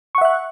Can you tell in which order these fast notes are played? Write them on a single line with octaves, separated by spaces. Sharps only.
C#6 F#5 E5 F#6